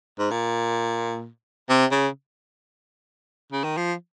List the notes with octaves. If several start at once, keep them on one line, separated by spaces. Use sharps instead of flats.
G#2
A#2
C3
C#3
C#3
D#3
F3